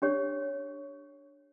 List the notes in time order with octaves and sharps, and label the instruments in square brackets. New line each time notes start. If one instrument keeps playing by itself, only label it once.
[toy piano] D4 G4 C#5